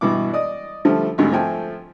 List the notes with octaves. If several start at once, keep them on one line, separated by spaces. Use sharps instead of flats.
G2 B2 E3 D6
D5 D#5 D#6
D3 F3 G3 A3
G#1 D2 D3 G3
F3 A3 G5 G#5